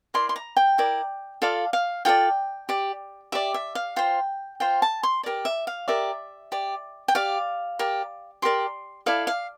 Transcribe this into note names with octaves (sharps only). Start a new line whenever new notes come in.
E4 A#4 D5 C6
C6
A#5
G5
E4 A#4 D5
F4 A4 D5 F5
F5
F4 A4 D5 G5
G4 D5
G4 D5 E5
E5
F5
F4 C5 G5
F4 C5 G5
A5
C6
G4 A#4 D5
E5
F5
G4 A#4 D5 E5
G4 D5
G5
G4 D5 F5
G4 A#4 D5
G4 A#4 D5 C6
E4 A4 D5 F5
F5